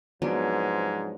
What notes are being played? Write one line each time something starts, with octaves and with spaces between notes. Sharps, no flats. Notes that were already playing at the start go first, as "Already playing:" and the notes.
G#2 C3 F3 F#3 B3 D4